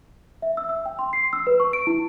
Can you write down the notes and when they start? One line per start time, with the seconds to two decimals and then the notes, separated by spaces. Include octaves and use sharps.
0.42 E5
0.57 E6
0.69 E6
0.86 G5
0.99 C6
1.13 C7
1.33 E6
1.47 B4
1.60 C#6
1.73 D7
1.87 E4